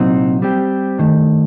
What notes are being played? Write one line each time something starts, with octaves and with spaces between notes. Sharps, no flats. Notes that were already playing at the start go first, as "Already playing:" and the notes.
Already playing: C2 A#2 F#3 C4 D#4
G3 C4 G4
G2 D#3 A3